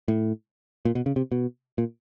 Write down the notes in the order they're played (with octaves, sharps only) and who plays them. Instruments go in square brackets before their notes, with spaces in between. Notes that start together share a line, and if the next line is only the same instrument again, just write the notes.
[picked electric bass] A2
A#2
B2
C#3
C3
B2
A#2